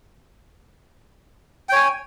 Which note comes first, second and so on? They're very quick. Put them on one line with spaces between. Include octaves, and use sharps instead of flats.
G5 C#5 G#5